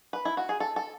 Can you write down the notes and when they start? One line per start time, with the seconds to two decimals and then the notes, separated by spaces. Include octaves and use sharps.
0.13 B4
0.25 E4
0.37 F#4
0.49 G#4
0.60 A4
0.76 A4